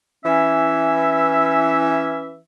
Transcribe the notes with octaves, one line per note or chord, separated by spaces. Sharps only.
E3 C#4 E5